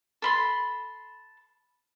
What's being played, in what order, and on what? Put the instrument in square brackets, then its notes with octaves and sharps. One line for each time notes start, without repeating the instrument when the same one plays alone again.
[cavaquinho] A4 B5 C6